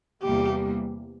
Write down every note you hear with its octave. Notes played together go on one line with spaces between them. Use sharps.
E2 C3 G3 A#3 G4